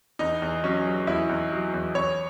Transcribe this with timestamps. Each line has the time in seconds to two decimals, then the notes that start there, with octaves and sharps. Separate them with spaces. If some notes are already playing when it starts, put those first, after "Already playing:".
0.19 E2 D#4
0.42 E2
0.63 F#3 C#4
0.86 F#3
1.07 E2 E4
1.29 E2
1.51 F#3
1.74 E2
1.95 E2 C#5